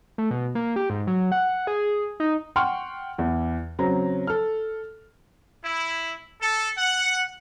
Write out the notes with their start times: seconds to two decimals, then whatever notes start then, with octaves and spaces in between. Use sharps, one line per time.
0.18 A3
0.31 B2
0.55 A#3
0.76 G4
0.90 G#2
1.07 F#3
1.32 F#5
1.67 G#4
2.20 D#4
2.56 F#5 G5 C6 C#6 F6
3.18 E2
3.79 C#3 F#3 C4 A#5
4.27 A4 F6
5.65 E4
6.41 A4
6.78 F#5